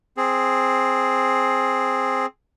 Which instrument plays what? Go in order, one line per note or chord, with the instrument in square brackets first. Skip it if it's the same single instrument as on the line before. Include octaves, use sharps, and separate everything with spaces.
[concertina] C4 G#4